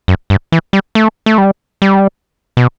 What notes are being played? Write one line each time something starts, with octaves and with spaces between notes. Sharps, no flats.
F#2
G2
E3
G3
A3
A3
G3
G3
B2